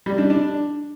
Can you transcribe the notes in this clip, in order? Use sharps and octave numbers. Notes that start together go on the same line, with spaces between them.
G3
D4
D4